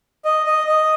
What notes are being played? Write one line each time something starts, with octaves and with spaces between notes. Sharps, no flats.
D#5
D#5
D#5